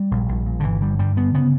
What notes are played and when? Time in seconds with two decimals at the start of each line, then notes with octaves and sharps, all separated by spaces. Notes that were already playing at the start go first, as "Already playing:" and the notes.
Already playing: G3
0.11 A#1
0.29 A#1
0.46 A#2
0.60 D3
0.63 G1 E3
0.81 D3 G3
0.99 G2 G3
1.17 D3 B3
1.34 C#3 B3